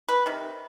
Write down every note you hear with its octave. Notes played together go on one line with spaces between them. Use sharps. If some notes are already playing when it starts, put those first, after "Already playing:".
B4
C3 D#3